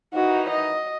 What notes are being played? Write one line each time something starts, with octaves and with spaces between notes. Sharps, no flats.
D#3 E3 D#4 F#4
D#5